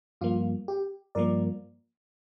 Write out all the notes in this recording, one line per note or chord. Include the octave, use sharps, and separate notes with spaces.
G2 F3 A#3 F4
G4
G2 F3 A#3 A#4 D5